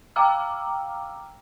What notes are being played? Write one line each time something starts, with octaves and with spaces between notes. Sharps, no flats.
F5 G5 A#5 D6 E6 F6